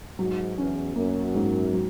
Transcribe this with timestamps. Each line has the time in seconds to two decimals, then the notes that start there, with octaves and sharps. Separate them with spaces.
0.19 G#2 F#3
0.57 E2 C#4
0.95 F#2 A#3
1.35 G#2
1.73 F#3